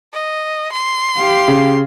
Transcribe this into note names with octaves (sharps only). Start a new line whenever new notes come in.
D#5
C6
G4 F5
C#3